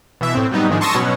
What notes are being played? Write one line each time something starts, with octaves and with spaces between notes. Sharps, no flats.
B2 E3 E5
A2 C4
F#3 G3 B3 D#4
G#2 D#3 F3 G#3 D4
A5 C6 C#6 D#6 E6 A#6
B2 F#3 B3 C#4